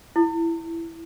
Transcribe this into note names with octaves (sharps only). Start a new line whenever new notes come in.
E4